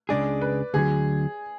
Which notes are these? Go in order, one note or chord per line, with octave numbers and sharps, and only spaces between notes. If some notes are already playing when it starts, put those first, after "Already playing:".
C#2 C#3 G#3 D4 G#4 D5
B4
D2 D3 F#3 G#4